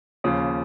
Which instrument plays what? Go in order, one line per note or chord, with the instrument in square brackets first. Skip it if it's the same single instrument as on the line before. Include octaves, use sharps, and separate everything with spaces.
[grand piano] D#2 C#3 F3